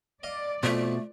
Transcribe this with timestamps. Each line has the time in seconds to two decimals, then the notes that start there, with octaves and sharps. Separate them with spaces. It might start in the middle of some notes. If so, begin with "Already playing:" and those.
0.23 D5 D#5 F5
0.63 F2 B2 F3 A3